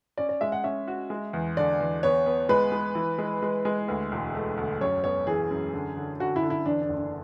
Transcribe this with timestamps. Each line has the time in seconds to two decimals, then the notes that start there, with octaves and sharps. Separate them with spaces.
0.18 C#4 D5
0.29 D5
0.41 G#3 E5
0.52 F#5
0.64 C#4 E5
0.88 F#4
1.10 G#3
1.33 E2
1.57 D3 D5
1.80 E2
2.03 B3 C#5
2.26 B3
2.49 G#3 B4
2.72 G#3
2.95 E3
3.18 G#3
3.42 G#3
3.65 G#3
3.88 D2 B4
4.12 E1
4.35 A3
4.57 D2
4.81 F#2 C#5
5.04 B3 C#5
5.27 E3 G#4
5.51 F#2
5.73 D3
5.97 D3
6.20 D3 F#4
6.36 E4
6.42 D3
6.50 E4
6.66 E2 D4
6.82 D4
6.89 F#1
6.97 D4